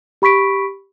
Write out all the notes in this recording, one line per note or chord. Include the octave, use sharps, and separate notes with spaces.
G4 B5 C#6 B6 D7